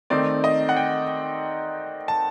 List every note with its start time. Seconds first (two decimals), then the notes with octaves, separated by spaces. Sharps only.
0.10 D#3 A3 C4 D#4 D5
0.44 D#5
0.69 F#5
0.77 G5
2.08 A5